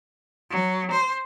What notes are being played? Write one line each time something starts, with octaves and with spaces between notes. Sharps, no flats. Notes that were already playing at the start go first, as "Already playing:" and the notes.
F#3
C5